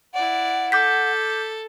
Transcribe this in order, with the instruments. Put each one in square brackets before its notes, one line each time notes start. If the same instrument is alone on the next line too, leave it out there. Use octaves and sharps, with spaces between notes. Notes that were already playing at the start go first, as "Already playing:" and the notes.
[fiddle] E4 D5 [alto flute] F#5
[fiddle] A4 [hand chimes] D6 G6 B6